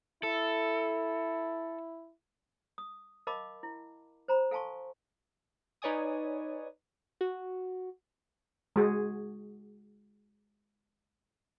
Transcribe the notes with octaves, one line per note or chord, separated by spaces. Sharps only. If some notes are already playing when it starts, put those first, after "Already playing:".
E4 A4
D#6
A#4 D#5 F5 A5 B5 D6
E4
C5 A#5 B5
A4 F5 G#5 A5 C6 C#6
D#4 B4 C#5 D5 G#5 D#6
F#4
G#3 F#4 G#4